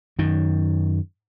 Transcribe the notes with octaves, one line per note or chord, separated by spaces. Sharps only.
F#2 D#3